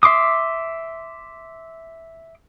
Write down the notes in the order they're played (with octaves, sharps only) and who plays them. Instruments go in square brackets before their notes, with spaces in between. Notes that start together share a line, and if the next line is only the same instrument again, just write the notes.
[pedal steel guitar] E5 C6 D6 D#6